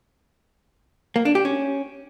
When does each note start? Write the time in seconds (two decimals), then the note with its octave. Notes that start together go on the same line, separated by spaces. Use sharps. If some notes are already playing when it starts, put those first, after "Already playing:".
1.16 A#3
1.25 D4
1.35 G4
1.45 C#4